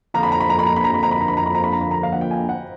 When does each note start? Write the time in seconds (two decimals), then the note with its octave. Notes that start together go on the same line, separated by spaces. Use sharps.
0.14 F2 D3 F3 A#3 A#5
0.23 B5
0.32 A#5
0.40 B5
0.50 A#5
0.59 B5
0.66 A#5
0.76 B5
0.84 A#5
0.94 B5
1.03 A#5
1.11 B5
1.21 A#5
1.28 B5
1.37 A#5
1.46 B5
1.55 A#5
1.64 B5
1.73 A#5
1.81 B5
1.91 A#5
2.03 F5
2.12 F#5
2.21 G5
2.31 G#5
2.49 F#5